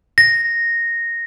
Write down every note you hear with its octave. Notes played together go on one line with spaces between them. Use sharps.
A#6